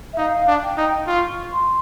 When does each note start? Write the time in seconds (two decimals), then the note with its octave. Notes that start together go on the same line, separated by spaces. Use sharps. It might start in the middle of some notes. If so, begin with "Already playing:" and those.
0.13 E5
0.17 D#4 F5
0.47 D4
0.62 G5
0.77 D#4
1.07 F4 C#6
1.52 C6